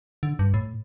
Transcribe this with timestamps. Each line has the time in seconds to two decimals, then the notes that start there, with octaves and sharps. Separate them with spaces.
0.23 D3
0.39 G2
0.54 A2